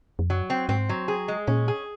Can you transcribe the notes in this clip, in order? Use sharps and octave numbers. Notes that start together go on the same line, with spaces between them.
F2
F#2 F#3
C4
G#2 C4
F#3
G#4
G#3
A#2 C#4
G#4